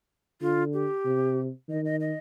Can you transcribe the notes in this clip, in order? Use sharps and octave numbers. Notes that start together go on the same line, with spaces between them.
D3 F4
G4
C3
D#3 D#5
D#5
D#5